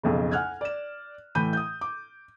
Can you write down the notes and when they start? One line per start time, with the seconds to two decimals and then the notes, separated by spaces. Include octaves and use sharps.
0.03 B1 F2 C#3
0.31 F#5 G#5 F6 F#6 G#6
0.61 D5 E7
1.35 A2 E3 B5 G6 D#7
1.53 D#6 G6
1.81 D6